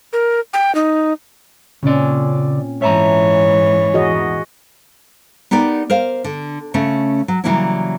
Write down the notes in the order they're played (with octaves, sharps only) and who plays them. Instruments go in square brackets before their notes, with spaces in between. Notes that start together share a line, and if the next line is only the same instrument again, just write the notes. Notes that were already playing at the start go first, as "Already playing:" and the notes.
[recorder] A#4
G5
D#4
[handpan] A#2 C4 C#4 [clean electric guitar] C#3 D5
[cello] G#2 E3 [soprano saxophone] C#5 [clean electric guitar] E5 A5 A#5
[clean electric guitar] E2 [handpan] F#4 G#4 D#5
[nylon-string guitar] B3 D#4 G4 A#4 D5
A#4 C5 F5
D3
C#3 A3 C#4
F#3
C#3 E3 F#3 G3 A#3 E4